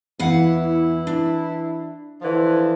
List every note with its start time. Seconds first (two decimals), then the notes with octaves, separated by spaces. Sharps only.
0.19 E2 E3 E4 F5 F#5
1.07 D4
2.22 D3 E3 F3